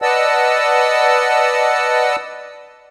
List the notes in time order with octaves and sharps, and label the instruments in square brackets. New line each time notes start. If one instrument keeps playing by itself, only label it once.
[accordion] B4 D5 D#5 F#5 A5 E6